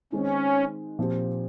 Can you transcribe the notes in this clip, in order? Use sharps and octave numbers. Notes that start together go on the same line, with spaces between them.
D#3 G#3 C4 C#4
A#2 F3 C4 G4